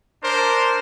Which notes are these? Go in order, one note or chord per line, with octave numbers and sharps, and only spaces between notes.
D4 A#4 C5